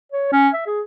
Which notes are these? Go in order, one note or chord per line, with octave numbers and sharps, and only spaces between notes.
C#5
C#4
E5
G#4